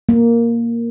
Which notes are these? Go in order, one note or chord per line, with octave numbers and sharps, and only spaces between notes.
A#3